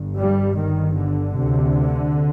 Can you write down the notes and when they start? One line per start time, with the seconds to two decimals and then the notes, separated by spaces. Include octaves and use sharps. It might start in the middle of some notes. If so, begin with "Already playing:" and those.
Already playing: G1 G2
0.18 G3
0.57 G1 G2 D#3
0.97 D3
1.36 D2 C3